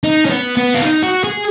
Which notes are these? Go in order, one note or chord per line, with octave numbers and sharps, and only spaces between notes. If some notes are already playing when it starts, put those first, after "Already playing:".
D#4
C#4
B3
B3
F4
D#4
F#4
G#4